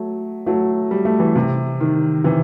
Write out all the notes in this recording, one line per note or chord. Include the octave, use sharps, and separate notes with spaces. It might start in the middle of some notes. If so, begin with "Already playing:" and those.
Already playing: F#3 A3
F#3 A3
G3
A3
E3 G3
C3
D#3
C3 E3